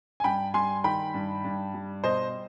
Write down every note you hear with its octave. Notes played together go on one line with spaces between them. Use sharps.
G#5
G2 G5 B5
G3 G#5 C6
D#3 G5 B5
G2
G2
G3
B2 C5 D#5